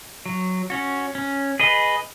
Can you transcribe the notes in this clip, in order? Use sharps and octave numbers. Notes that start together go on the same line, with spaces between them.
F#3
C#4 F#4
C#4
G#4 B4 D#5